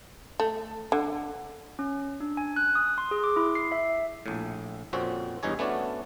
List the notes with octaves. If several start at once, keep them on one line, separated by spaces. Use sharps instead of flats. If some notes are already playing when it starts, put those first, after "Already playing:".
A3
D3
C#4
D4
G#5
F#6
D#6
C6
G#4
D6
E4
C7
E5
A#1 A2
F2 A#2 C4 C#4 F#4
E2 G2 D#4 G#4 C#5
A3 B3 C#4 D4 F#4 D5